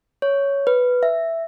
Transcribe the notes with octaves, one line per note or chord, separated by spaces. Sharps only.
C#5
B4
E5